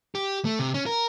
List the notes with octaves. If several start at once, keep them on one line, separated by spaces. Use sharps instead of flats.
G4
A3
C3
C#4
A#4